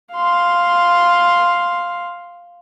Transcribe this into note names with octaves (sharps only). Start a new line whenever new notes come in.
F5 C6